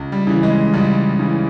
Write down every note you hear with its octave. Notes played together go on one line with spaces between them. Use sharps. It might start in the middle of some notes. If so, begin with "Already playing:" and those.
Already playing: C#2
G3
C#3 E3
G#3
C#2 G3
C#3 E3